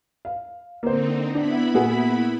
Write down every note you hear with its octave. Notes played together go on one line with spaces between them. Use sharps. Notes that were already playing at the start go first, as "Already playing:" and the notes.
F5
D3 A#3 C4 D#4 C5
B3 D4 E4 B5
A#2 F#4 G#4